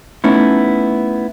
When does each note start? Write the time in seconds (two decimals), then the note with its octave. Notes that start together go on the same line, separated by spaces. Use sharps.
0.24 A3 B3 C#4 D#4 E4